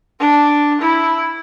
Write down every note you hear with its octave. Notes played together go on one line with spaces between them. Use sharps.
D4
E4